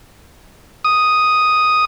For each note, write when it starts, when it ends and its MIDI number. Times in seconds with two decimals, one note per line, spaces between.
0.84 1.85 87